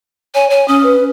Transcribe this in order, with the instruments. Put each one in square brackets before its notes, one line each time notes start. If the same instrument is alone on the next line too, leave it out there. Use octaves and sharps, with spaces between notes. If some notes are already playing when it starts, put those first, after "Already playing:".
[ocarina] C#5 [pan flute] G#5
[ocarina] C#5 [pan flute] G#5
[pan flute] C#4 [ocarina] D#6
[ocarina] B4